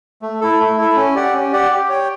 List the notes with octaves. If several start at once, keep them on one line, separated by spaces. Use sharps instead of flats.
A3
E4 A4
A3
E4 A4
C#4
G4 D5 F#5
C#4
G4 D5 F#5
G4
C#5 G5